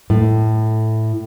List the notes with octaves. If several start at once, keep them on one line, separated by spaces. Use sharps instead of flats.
A2